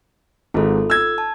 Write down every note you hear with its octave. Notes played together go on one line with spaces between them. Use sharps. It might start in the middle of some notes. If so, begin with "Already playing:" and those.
G#1 G#2 F4 A4
E6 G#6
A5